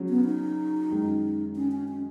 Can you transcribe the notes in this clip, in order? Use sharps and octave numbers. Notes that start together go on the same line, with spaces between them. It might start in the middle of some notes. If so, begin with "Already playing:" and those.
Already playing: C#3 F#3 C#4
B3
D#4
F#2 D#3 G#3
C#4
C#4
C#4